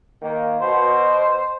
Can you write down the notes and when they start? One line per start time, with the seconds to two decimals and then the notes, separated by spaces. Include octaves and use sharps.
0.22 D#3 A#3
0.61 B2 C5